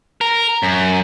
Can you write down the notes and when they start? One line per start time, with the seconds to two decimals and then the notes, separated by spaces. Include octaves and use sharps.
0.21 A#4
0.63 F#2